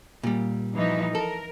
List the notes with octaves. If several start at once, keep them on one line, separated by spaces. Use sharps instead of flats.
A#2 G3
E3 F3 D#4
A4 A#4